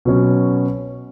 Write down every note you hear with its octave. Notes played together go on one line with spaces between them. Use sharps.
B2 F#3 C#4